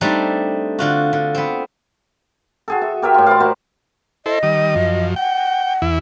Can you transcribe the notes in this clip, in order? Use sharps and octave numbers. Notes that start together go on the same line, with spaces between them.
G3 A3 C4 D4 D#4
D3 F4 F#4
D3
B3 C4
F#4 G#4 A4
E5
G4 A#4 C#5 E5
A2 F4
E4 C5 D5 F5
F#4 A#4 C5
E4 A4 C5 D#5
D#3 G3 D#6
F#2 F3
F#5 G5
E2 E4